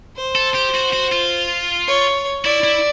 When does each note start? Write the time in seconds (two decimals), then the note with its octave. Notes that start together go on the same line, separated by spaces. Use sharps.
0.16 C5
0.35 A4
0.54 G4
0.74 F#4
0.93 F#4
1.12 F4
1.87 C#5
2.45 E4 D5
2.64 E4